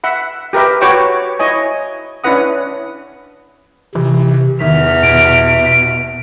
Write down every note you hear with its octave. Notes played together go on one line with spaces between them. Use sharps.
E5 F#5 B5
G4 A#4 B4 E5
F#4 B4 C#5 G5 C#6 D6
E4 C#5 D#5 G#5
C#4 D4 E4 B4 F#5 D#6
C3 E3
E2 D#3 E5 F6
B2 D7